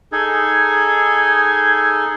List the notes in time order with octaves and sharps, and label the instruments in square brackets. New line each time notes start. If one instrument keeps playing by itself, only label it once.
[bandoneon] D#4 G#4 A4 [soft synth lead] G#6